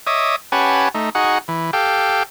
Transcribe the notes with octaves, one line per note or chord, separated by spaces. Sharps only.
C#5 D#5 E5 D6 D#6
C#4 G4 B4 F#5 G#5 A5
A3 D#4
D#4 F#4 G#4 F#5
E3
G4 A4 F5 G5